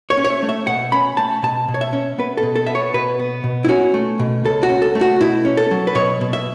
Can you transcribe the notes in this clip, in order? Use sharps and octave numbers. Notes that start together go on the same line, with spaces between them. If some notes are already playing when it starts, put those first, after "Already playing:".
C#5
C#4
C#5
E5
A3
E5
B2 F#5
C#4 B5
A3 A5
B2 A5
B2
C#5
E5
C#4
B3 B4
A4
B2
A4
B3 E5
C#5
B2 B4
B3
B2
E4
C#4 F#4
A3
B2
C#2 A4
F#4
C#4
A4
A3
F#4
B2 E4
C#4
A4
F#3
B4
B2 C#5
B2
E5